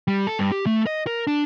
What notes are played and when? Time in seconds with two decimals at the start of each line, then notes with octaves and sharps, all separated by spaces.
0.07 G3
0.27 A4
0.39 G2
0.52 G4
0.66 A3
0.87 D#5
1.07 A#4
1.27 D4